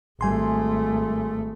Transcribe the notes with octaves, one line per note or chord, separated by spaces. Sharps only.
G#1 G3 A3 G#5 C6